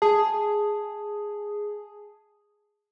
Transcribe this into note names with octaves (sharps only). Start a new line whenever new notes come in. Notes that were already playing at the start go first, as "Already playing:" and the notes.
G#4 A5